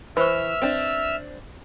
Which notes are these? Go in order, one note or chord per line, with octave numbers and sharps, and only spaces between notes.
E3 B4 C5 E5 C#6 E6 F6
C4 D4